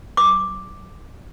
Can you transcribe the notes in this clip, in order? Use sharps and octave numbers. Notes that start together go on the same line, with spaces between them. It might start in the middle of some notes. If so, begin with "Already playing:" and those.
D6